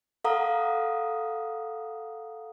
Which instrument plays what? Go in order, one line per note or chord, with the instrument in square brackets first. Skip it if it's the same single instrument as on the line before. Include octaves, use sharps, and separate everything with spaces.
[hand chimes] A4 F5 F#5 A#5 D#6